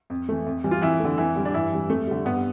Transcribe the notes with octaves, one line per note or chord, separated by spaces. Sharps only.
F2
E3 A3
F2
E3 G3
F4
F2 E3 E4
D3 A3
F2 E3 E4
D3 G3
D4
G2 E3 E4
E3 G3
F2 A3
D3 G3
G2 B3